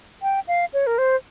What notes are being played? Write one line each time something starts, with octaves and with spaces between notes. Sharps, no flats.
G5
F5
C#5
A#4
C5